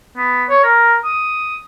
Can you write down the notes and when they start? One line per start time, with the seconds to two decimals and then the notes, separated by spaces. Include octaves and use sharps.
0.17 B3
0.50 C#5
0.64 A#4
1.04 D#6